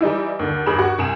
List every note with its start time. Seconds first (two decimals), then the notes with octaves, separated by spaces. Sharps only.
0.01 E3 G3 D#4 E4
0.39 D#2 D3
0.66 G1 D#2 G#4 B5 E7
0.79 F#4
0.99 C2 G#5 E7